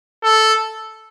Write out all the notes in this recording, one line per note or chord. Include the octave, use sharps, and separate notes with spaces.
A4